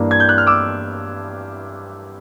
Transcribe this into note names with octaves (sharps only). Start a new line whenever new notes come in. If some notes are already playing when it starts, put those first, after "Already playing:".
Already playing: G2 E3 G3 A#3 D4
G#6
G6
F#6
F6
D6 E6